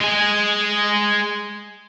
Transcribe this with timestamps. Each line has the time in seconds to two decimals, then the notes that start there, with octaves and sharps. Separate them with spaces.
0.01 G#3 G#4